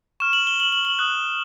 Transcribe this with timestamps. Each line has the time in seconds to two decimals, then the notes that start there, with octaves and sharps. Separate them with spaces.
0.20 C#6 F6 E7
0.33 F#7
0.47 G7
0.60 F#7
0.72 F#7
0.85 F#7
0.99 D#6 F#6